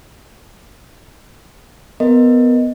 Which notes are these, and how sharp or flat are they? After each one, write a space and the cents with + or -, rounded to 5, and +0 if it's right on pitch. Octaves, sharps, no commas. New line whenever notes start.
B3 +15 A#4 +0 D#5 +0